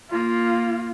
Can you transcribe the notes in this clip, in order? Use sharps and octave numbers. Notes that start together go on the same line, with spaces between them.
A#3 F4